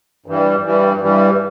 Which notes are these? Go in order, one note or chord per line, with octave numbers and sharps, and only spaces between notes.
G2 E3 G3
G2 E3 G3
G2 E3 G3